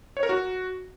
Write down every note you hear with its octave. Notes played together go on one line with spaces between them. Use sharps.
C#5
A#4
F#4